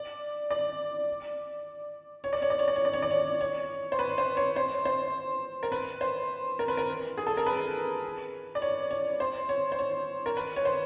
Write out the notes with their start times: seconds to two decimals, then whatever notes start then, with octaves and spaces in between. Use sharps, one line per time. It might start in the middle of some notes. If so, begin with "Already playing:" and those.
Already playing: D5
0.51 D5
2.24 C#5
2.33 D5
2.42 C#5
2.50 D5
2.59 C#5
2.68 D5
2.76 C#5
2.85 D5
2.94 C#5
3.02 D5
3.11 C#5
3.41 C#5
3.92 C5
3.99 B4
4.18 C5
4.37 C#5
4.56 C5
4.85 C5
5.63 A#4
5.72 B4
6.01 C5
6.59 A#4
6.68 B4
6.77 A#4
7.18 G#4
7.27 A4
7.37 A#4
7.47 B4
8.55 D5
8.62 C#5
8.91 C#5
9.20 C5
9.49 C#5
9.72 C5
9.79 C#5
10.26 A#4
10.37 B4
10.56 C#5
10.65 C5